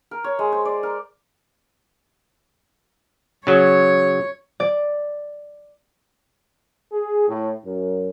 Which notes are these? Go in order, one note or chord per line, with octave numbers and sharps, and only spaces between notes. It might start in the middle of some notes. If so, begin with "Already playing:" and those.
A#4
C#5
G#3
C5
D5
A#4
C#3 F#3 C#5
D5
G#4
A2
F#2